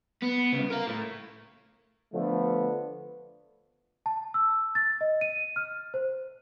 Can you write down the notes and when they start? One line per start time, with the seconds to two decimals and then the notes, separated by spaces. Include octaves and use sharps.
0.22 B3
0.53 C2 C#3
0.70 A#4 F5
0.87 A2
2.13 D3 F3 A3 B3
4.06 A5
4.34 E6
4.75 A6
5.01 D#5
5.21 D#7
5.56 F6
5.94 C5